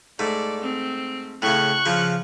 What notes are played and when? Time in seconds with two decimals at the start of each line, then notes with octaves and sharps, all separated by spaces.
0.19 G#2 A3 D5
0.61 C4
1.42 A2 C#3 C#6 F#6
1.86 C#3 F3